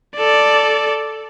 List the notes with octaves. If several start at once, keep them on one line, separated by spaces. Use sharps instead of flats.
A4 D5